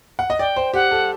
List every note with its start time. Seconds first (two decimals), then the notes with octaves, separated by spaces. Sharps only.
0.19 F#5
0.30 D#5
0.39 D5 G5
0.56 C5
0.74 G4 F#5
0.91 A4